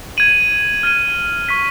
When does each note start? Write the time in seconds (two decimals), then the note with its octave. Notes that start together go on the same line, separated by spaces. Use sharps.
0.17 G#6 D#7 F#7
0.83 F6 G#6 D#7
1.49 C#6 F6 B6